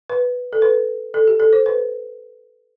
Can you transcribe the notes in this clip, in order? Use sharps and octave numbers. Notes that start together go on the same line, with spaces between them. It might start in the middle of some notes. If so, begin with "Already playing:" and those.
B4
A4
B4
A4
G4
A4
C5
B4